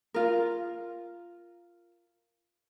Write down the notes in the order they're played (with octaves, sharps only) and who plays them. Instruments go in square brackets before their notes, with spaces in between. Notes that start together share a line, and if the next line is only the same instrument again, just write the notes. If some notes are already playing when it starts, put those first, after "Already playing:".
[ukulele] F4 A#4